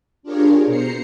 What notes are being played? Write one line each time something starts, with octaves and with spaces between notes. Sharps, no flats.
D4 F4 G4 G#4 A#4 C#5
B2 C5 A#5 C7 C#7